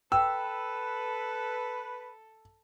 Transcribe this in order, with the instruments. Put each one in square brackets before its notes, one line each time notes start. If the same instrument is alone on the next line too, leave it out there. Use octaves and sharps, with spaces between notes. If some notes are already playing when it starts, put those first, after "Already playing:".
[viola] A4 [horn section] B4 [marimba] G5 [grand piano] E6